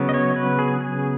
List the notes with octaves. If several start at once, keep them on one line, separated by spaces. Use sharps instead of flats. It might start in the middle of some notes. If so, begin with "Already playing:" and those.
Already playing: C#3 F#3 B3
D#5
C#5
B4
G#4
G#4